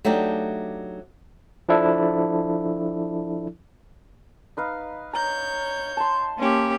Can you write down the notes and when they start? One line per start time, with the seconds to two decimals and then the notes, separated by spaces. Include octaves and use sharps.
0.05 F#3 A3 D4 D#4 G4
1.69 F3 D4 E4 A4
4.57 D#4 B4 F5
5.13 C#5 A#5 G6
5.97 A5 C6
6.38 A#3 C#4 G4